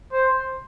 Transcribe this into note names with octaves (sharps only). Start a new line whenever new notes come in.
C5